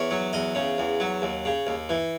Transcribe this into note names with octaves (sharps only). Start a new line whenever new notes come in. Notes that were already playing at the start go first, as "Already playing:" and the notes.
Already playing: E2 C#5
F#3
E2 D#5
C#3
E2
F#3
D#2
C#3
D#2
E3